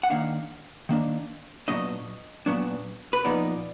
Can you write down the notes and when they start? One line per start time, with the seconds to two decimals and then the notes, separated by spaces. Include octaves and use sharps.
0.03 F#5
0.10 D#3 A#3 D4 F5
0.89 D#3 A#3 D4
1.68 A#2 F#3 B3 D4 D#5
2.46 A#2 F#3 B3 D4
3.13 B4
3.25 A#2 F3 B3 D#4 D5